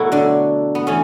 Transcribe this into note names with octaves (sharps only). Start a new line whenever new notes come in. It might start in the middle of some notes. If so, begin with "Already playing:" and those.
Already playing: B2 F#3 A3 E4 F#4 A4
D3 D4
B3
E3 A3 C#4